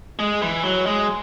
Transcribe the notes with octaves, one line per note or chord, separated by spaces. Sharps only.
G#3
E3
F#3
G#3